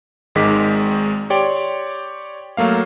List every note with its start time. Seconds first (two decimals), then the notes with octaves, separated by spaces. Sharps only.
0.35 G#1 G#2 D#3 G#3 D6 B6
1.30 G4 C#5 D5 G5 C6
2.57 F#3 A3 A#3 F5